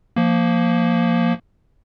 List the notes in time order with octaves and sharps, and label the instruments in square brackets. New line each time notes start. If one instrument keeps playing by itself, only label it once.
[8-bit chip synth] F3 A#3